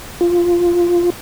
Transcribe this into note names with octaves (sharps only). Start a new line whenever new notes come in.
F4